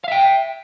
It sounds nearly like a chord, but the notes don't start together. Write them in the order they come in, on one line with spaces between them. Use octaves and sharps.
F5 E5 G5